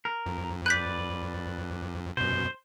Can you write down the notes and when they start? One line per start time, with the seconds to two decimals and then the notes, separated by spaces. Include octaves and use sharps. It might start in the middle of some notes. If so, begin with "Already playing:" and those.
0.05 A#4
0.26 F2
0.66 B4 D5 F#6 G6 B6
2.17 F#2 B2 C5